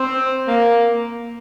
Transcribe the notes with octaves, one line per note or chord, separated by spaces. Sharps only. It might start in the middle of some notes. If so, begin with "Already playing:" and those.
Already playing: C4
A#3